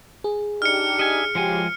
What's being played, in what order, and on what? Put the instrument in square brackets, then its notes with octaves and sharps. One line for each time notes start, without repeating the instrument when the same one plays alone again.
[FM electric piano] G#4
[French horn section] D4 D#4 G4 [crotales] F6 C#7
[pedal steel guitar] D#5 E5 G#5
[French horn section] C#3 F#4 G4 [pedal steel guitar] F3 G#3 G#5